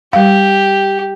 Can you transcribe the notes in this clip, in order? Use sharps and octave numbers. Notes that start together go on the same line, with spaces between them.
G3 G4 F5